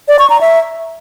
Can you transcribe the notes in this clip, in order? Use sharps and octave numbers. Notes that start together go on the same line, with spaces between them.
D5
C#6
A#5
E5